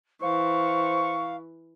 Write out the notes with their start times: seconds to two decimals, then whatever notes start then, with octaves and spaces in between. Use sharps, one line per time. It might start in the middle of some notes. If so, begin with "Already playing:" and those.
0.22 E3 C5 F5 C#6